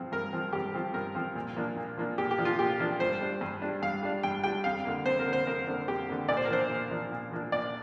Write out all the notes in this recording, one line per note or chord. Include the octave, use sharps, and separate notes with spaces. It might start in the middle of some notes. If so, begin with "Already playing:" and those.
Already playing: G2 F3 C4
G2 A#4
F3 C4
G2 G4
F3 C4
G2 A#4
F3 C4
A#2
F3 A#3 D4
A#2
F3 A#3 D4
A#2 G4
G4
F3 A#3 D4
F4
A#2 G4
F3 A#3 D4
G2 C5
G3 D4
G2
G3 D4
G2 F5
G3 D4
G2 G5
G3 D4 G5
F2 F5
D3 A#3
F2 C5
A#4
D3 A#3
C5
F2 A#4
D3 A#3
F2 G4
D3 A#3
A#2 D5
C5
A#4
F3 A#3 D4 C5
A#2
F3 A#3 D4
A#2
F3 A#3 D4
A#2 D5